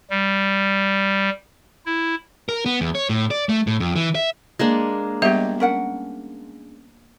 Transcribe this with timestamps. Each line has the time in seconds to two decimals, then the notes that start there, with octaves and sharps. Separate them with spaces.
0.10 G3
1.86 E4
2.49 A#4
2.66 B3
2.81 E2
2.95 C#5
3.09 A2
3.31 D5
3.49 A3
3.67 A2
3.80 F2
3.96 E3
4.15 E5
4.59 G#3 A#3 D4
5.22 G3 B3 G4 C#5 D#5 E5
5.60 C#4 A#4 F#5